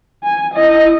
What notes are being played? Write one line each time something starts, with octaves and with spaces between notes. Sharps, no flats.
G#5
E4 D#5